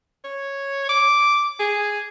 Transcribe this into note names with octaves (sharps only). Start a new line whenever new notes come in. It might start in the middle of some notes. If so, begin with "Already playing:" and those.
C#5
D6
G#4